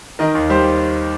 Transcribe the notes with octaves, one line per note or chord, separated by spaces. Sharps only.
D#3 A#4 D#5
D#2
G3 G4 C5